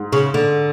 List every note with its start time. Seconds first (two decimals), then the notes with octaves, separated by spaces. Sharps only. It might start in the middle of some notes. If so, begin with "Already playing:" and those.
Already playing: G#2
0.12 C#3
0.34 D3